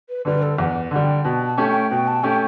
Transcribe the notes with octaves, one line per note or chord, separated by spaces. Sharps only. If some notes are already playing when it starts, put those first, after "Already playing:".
B4
D3 G3 B4
A4
E2 F#5
D3 G3 F#5
G5
B2 A5
A5
A3 C#4 G4
G5
B2 G5
A5
A3 C#4 G4 G5